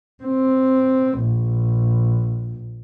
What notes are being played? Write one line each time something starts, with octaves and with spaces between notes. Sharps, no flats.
C4
A#1